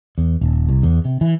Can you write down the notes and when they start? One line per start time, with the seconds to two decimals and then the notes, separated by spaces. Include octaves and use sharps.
0.18 E2
0.41 D#1
0.68 C2
0.83 E2
1.05 C3
1.21 E3